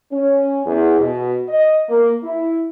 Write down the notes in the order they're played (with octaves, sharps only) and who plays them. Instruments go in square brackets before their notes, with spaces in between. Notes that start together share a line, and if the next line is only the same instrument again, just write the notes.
[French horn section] C#4
E2
B2
D#5
A#3
E4